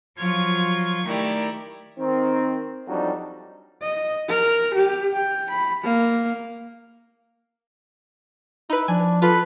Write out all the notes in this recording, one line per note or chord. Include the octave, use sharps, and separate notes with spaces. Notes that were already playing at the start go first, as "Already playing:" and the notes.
F3 F#3 F4 C#6 G#6
D#3 A3 E4 G4 A#4 D5
D#3 C4
F2 F#3 G3 D4 D#4
D#5
A#4
G4
G5
B5
A#3
D#4 E4 B4
F3 D4 G#5
F4 A4 B4